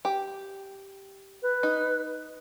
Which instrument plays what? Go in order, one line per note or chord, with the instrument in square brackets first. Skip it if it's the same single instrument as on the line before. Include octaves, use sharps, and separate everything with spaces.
[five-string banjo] G4
[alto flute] B4
[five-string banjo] D#4